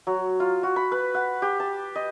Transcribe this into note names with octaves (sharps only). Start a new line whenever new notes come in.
F#3
F4
F#4
B5
B4
F#5
G4
A5
D#5